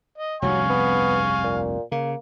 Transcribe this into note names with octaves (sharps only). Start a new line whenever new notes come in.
D#5
F1 C2 G2 F#3 F5 G#5 C#6
B3
A#2
C#3 A#3